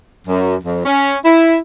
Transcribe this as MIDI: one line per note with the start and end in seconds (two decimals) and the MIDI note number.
0.27 0.56 42
0.63 0.81 41
0.85 1.16 61
1.25 1.57 64